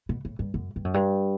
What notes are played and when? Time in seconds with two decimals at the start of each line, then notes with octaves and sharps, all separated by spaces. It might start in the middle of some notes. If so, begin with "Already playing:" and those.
0.09 B2
0.25 A2
0.39 G2
0.54 F#2
0.76 G2
0.85 F#2
0.94 G2